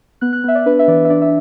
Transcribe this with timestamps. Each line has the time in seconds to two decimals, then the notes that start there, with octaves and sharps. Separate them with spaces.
0.21 B3 F#6
0.33 F#6
0.44 B3 E5
0.55 D5
0.66 D4 B4
0.79 E5
0.88 E3 D5
1.05 E5
1.10 D4 D5
1.22 E5